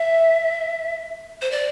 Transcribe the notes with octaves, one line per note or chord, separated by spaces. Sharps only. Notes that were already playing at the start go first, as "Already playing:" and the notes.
Already playing: E5
C5
D5